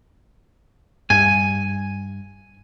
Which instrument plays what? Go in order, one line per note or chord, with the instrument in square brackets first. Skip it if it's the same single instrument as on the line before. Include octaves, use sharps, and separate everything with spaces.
[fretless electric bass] G2 [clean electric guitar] G#5